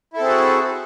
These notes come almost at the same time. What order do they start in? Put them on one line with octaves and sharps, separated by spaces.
E4 A4 C4 G#4 F#4